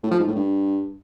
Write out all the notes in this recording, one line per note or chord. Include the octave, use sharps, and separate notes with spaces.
A2
F3
G#2
A2
G2